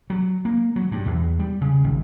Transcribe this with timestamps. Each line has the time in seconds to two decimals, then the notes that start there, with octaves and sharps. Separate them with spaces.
0.10 F#3
0.45 A#3
0.76 F#3
0.91 G2
1.06 E2
1.39 G3
1.61 C#3
1.84 G#1